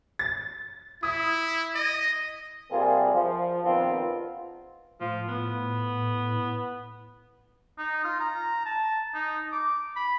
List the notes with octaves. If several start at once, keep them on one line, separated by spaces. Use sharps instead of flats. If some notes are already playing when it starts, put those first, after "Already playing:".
A6
E4 D#6
D#5
C3 G3 A#3 F4 G#4
F3
A#1 D#3 B3 C4 F4
A2 F3
B3
D#4
F4
A#5
A5
D#4
D6
B5